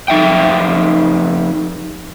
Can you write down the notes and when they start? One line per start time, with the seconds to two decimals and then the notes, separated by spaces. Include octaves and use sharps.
0.08 F2 D#4 E5 G5